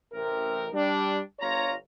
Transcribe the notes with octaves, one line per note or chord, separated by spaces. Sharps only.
A1 C3 A#4
G3 D4
G1 F4 C#5 A#5